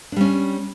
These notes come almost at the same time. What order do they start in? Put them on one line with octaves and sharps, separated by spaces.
D4 G3 C#4